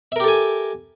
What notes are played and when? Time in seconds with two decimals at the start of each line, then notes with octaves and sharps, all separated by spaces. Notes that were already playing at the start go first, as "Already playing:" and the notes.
0.12 E5
0.16 A#4
0.20 G4
0.24 A4
0.28 G#5